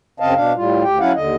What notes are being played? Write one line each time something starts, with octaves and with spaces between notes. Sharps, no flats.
F#2 C#3 C4 D#5 F5 A5
B2 D4 F5
A2 G3 F4
D2 G4 G5
F#3 C#4 E4 F5 F#5
D#2 D3 D#5